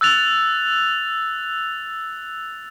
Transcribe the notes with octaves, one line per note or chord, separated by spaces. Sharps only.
E6 F#6 A6 F7